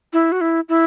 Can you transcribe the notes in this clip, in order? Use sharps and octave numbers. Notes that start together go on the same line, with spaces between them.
E4
F#4
E4
E4